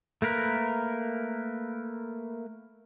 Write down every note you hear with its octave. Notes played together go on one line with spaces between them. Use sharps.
A3 A#3 A#4 B4